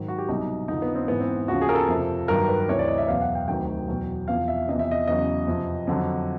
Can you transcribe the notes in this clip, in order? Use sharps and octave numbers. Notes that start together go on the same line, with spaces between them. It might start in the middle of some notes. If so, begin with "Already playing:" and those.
Already playing: G#2 D#3 F#3
F#4
G4
C2 B2 F#3 D#4
F2 D3 F3 D#4
B3
C4
G#2 E3 B3
C4
D#2 C#3 F3 F#4
G#4
A#4
A4
F2 C3 F3
G2 D#3 F#3 A#4
B4
D2 C3 E3 C#5
D5
D#5
E5
E2 B2 F#3 F5
F#5
G5
D2 C3 D#3 F#3 G5
E2 B2 F#3
E2 C3 F3 F5
E5
E2 C3 F3 D#5
E5
D#5
E2 C#3 F#3 D#5
F2 C3 F3
F2 D3 F#3